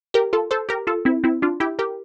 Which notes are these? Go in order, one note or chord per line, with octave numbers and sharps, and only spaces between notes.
G4 A#4
F4 A4
A4 C5
G4 A#4
F4 A4
C4 E4
C4 E4
D4 F4
E4 G4
G4 A#4